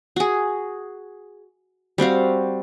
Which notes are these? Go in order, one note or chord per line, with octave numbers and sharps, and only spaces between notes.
F#4 G#4
G3 C4 F#4 F5